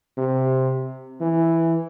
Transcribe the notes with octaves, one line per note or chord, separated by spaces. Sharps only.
C3
E3